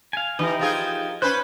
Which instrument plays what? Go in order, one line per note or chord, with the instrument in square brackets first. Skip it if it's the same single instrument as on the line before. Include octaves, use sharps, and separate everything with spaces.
[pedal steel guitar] F5 G#5
[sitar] E3 [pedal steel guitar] D#4 G4 A#4
[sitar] F3 F4 G#4
[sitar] C#4 B4 C5 [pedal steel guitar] F#6